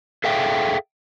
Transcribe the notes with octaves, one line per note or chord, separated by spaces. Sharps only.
G#4 A4 E5 F5 G5